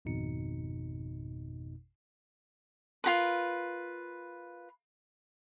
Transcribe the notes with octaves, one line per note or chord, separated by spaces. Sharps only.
G#1 F2 B2 D#4 C#7
F4 G4 A#4 B4